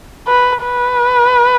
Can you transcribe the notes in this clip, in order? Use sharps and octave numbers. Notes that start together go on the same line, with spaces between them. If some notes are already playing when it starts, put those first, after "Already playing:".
B4
B4